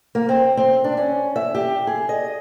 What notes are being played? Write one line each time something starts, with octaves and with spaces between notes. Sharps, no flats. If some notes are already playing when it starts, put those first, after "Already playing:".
A#3
C4
C4
D4
C#4
E5
G4
G#4
D#5